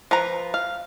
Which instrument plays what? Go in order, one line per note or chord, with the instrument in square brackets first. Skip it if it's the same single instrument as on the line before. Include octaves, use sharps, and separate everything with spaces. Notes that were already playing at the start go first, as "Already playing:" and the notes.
[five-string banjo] F3 B4 A#5
F5